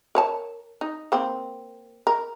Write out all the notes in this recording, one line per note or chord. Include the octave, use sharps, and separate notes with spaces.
A#4 C#5 A5
D#4
A#3 C4
A#4